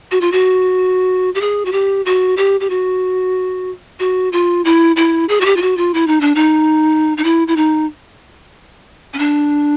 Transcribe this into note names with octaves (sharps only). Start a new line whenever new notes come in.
F#4
F4
F#4
G4
G#4
F#4
G4
F#4
G4
G4
F#4
F#4
F4
E4
E4
G#4
F#4
G4
F4
F#4
F4
E4
D#4
D4
D#4
D#4
E4
E4
D#4
C#4
D4